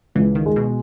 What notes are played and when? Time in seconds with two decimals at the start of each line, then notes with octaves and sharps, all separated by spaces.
0.15 C#2 E3
0.35 D#3
0.46 G#3
0.56 B2